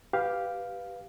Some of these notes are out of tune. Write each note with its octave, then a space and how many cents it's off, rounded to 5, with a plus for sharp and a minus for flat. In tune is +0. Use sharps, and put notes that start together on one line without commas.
G4 +0 B4 +0 F5 +0